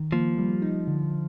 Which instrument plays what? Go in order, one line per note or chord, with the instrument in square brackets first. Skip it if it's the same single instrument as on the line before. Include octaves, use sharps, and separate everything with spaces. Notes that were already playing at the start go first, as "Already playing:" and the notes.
Already playing: [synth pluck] D#3
[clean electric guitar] F3 [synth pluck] A#3
[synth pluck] G3
D#4
D3